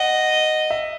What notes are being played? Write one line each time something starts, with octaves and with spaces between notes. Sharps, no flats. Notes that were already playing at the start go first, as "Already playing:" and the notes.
Already playing: D#5 F#5
E5